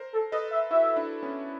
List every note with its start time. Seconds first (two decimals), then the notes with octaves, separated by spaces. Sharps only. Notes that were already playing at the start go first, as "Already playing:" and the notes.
Already playing: A#4 C5
0.13 A4
0.32 A4 B4 D#5
0.51 E5
0.70 E4 F#4 E5
0.96 D4 E4
1.23 B3 C#4